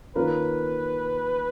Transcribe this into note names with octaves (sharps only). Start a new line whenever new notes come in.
D#3 A#3 C#4 F4 A#4 B4